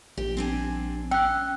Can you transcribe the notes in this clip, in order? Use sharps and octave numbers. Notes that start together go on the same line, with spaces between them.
A#1 G4
C4 D4 G#5
C#4 G5 E6 F#6